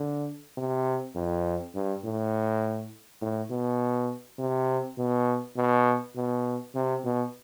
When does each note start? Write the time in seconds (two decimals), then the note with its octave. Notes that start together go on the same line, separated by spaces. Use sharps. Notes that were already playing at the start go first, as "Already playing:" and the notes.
Already playing: D3
0.57 C3
1.15 F2
1.74 G2
2.04 A2
3.21 A2
3.51 B2
4.38 C3
4.98 B2
5.56 B2
6.16 B2
6.75 C3
7.04 B2